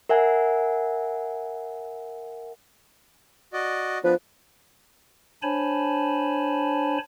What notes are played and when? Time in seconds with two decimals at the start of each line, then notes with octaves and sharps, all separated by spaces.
0.09 A#4 E5 F#5 G#5
3.53 F#4 D5 D#5
4.04 F3 B3 D4 B4
5.43 D4 C5 C#5 G#5 A5 B5